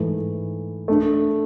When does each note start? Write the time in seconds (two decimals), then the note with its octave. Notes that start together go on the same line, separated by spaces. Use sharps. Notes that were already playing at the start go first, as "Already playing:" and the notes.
Already playing: G#2 E3 A3
0.88 A3 D4 A4